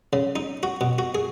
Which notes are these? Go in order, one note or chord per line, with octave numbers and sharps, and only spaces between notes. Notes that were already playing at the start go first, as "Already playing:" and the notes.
C#3
D#4
F#4
B2
F#4
G#4